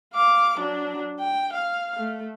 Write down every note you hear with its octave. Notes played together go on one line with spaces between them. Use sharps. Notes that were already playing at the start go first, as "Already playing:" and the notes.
F5 D6
F#3 D4
G5
F5
A3